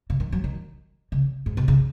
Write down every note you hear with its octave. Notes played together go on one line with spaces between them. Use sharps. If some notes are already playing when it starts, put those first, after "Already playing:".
C#3
D#3
F#3
D#3
C#3
G#2
B2
C#3